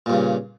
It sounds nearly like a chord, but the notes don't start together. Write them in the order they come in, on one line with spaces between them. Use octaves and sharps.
A#2 G2 C#3